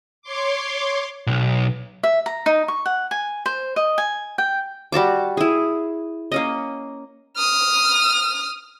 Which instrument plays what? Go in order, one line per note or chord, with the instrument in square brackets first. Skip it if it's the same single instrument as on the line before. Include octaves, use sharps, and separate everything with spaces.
[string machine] C#5 C6 D6
[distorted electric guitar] B1
[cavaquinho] E5
A#5
D#4
C#6
F#5
G#5
C5
D#5
G#5
G5
[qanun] G3 F#4 A5 D6
E4 G#4
A#3 C#4 D#5
[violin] D#6 F6